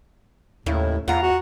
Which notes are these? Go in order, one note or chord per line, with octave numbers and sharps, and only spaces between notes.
D#2 A2 C#3 E4
E2 F4 F#5 A#5
F#4